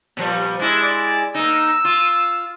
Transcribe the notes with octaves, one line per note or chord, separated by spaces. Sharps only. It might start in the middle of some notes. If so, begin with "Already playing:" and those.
A#2 F3 G3
G#3 D4 E4
D5
A#3 D#4 E6
F4